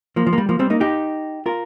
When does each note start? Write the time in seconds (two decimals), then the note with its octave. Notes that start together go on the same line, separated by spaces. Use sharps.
0.16 F3 A#3
0.27 F3
0.33 A#3
0.38 G3
0.49 F3 A#3
0.59 G3 C4
0.70 A#3 D#4
0.80 D#4 G4
1.46 F4 A#4